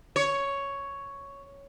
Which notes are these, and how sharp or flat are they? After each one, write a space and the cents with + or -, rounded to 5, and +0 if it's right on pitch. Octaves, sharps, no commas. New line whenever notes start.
C#5 +5